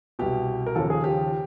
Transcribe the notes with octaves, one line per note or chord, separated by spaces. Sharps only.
C2 B2 G4
A#4
D#2 C#3 F3 A4
G#4
G4